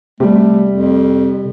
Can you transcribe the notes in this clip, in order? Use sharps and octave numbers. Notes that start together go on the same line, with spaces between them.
C3 G3 A3 G4
F2